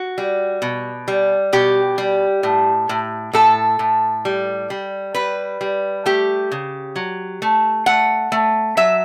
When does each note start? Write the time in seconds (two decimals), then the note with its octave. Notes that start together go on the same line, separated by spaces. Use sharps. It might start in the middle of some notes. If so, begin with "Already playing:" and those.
Already playing: F#4
0.18 G3
0.62 B2
1.08 G3
1.53 B2 G4
1.98 G3
2.43 A2
2.89 A2
3.33 A2 A4
3.79 A2
4.25 G3
4.70 G3
5.14 G3 B4
5.61 G3
6.06 A3 G4
6.52 C#3
6.96 F#3
7.42 A3
7.86 A3 F#5
8.32 A3
8.77 F#3 E5